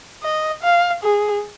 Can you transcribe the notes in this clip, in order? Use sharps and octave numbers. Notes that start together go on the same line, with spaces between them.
D#5
F5
G#4